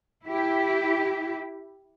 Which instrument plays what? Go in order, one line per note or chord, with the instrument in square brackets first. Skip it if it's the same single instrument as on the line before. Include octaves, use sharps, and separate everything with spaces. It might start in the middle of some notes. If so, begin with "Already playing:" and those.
[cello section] E4 G4